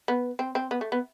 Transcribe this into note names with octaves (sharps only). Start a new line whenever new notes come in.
B3
C4
C4
B3
A3
B3